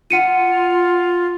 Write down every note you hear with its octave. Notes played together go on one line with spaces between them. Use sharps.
F4 F#5 C#7 D#7